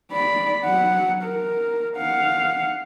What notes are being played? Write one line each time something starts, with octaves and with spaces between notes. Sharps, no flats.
D5 B5
F#3 F#5
A#4
F5 F#5